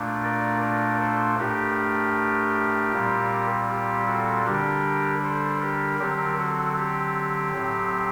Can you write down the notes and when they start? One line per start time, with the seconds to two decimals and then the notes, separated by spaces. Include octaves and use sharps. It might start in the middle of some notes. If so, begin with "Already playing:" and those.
Already playing: A#2 A3 D4
0.24 A#4 D5
0.62 A#4 D5
1.01 A4 C5
1.38 A2 A3 D4 G4 A#4
2.93 A#2 G3 C4
3.69 G4
4.07 F#4 A4
4.45 D3 G3 D4 G4 A#4
5.23 A4 C5
5.62 G4 A#4
5.99 D3 F#3 C4 G4 A#4
6.38 F#4 A4
6.77 G4
7.53 A2 F#3 C4